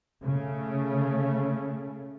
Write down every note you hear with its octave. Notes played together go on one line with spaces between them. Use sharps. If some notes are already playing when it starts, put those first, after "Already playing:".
C#3 A3